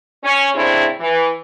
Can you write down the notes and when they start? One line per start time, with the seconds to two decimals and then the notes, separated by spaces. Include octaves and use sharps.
0.23 C#4
0.54 A2 C#3 C4 D4 E4
0.99 E3